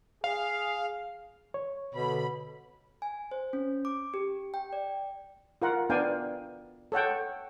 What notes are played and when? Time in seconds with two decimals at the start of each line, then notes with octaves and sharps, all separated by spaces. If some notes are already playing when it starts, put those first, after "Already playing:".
0.24 G#4 F5
1.54 C#5
1.95 B2 D3 B5
3.02 G#5
3.31 C5
3.53 C#4
3.85 D6
4.14 G4
4.54 G5
4.73 D5
5.62 F4 A#4 F#5
5.90 B3 D4 D5 F5 G5 G#5
6.92 A4 C#5 F#5 G5